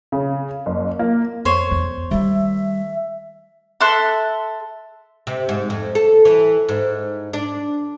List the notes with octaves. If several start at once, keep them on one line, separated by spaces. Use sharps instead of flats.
C#3
F#1
A#3
F2 C5 C#5
E2 B3
D#3 G3 A3 E5
A4 E5 C6 F#6
C3
G#2
F2
A4
E3
G#2
D4